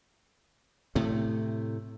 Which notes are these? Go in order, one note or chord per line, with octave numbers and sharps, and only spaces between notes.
A2 C3 A3